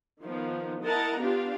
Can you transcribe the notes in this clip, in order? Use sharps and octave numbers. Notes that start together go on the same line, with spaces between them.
D#3 F3 B3
E4 A#4 D#5 F#5 A5 A#5
B3 D4 F4 G4 F5